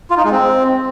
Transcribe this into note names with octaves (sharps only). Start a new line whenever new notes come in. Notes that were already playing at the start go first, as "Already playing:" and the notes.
F4
D#4
G#3
C4